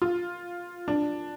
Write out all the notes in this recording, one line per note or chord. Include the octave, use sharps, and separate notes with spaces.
F4
D4